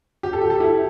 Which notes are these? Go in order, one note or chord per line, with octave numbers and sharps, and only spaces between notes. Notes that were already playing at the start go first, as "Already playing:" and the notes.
G4
A4
G4
A4
E4 G4